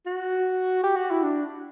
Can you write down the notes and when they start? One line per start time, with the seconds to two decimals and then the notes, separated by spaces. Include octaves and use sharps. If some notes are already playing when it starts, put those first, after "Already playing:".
0.06 F#4
0.84 G4
0.96 F#4
1.11 E4
1.23 D4